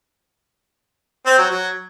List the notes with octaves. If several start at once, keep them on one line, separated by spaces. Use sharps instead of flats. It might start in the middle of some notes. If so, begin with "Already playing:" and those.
C4
F#3
F#3